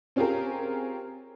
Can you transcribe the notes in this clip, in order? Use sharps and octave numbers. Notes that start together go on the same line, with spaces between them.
C4 C#4 F4 G4 G#4 A#4